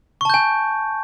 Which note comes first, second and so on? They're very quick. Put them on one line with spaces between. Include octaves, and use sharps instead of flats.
C#6 A5 G6 G#5